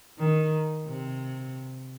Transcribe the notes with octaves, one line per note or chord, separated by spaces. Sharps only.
D#3
C3